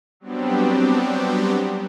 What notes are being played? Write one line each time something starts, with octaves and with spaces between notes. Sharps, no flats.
F#3 G3 B3 C4 D4 G4